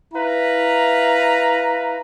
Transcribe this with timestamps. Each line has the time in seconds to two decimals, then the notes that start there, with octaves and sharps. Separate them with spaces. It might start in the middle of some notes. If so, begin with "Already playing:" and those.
0.14 E4 B4 F5 A#5